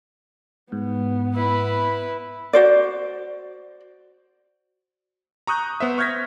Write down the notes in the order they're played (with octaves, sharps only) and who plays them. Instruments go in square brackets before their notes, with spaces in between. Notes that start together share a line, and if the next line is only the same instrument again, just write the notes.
[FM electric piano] G#2 [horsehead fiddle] B3
[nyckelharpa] E4 B4
[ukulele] F#4 C5 D5
[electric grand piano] A#5 C#6 D#6 F#6 G6
B3 C5 E5
C#6 F6 G6 G#6 A#6 B6